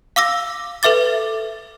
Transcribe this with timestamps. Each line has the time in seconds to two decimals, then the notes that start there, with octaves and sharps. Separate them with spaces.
0.16 F5 D6 E6 A#6
0.83 A4 B4 E5 D6 A6